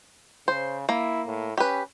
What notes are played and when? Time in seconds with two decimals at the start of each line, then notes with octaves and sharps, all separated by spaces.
0.48 C#3 C5
0.89 A#3 E4
1.27 A2
1.58 C#4 G4 B4